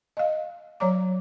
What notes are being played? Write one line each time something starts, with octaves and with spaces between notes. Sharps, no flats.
D#5 F5
F#3 C#5 D5 A#5 D6